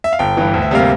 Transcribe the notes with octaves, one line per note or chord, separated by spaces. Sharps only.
E5
F5
G1 G5
G2 E3
D2
E5
C3 G3 A#3 F5